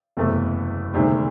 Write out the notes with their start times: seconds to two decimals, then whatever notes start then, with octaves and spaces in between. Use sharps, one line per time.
0.17 F#1 E2 C3 E3 A3
0.93 E1 D2 C3 D#3 G3